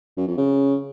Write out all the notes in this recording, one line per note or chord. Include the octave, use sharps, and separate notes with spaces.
F#2
F2
C#3